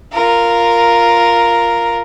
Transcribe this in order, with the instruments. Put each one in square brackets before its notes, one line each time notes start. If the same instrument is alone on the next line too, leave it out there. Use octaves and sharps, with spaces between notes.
[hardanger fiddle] F4 A#4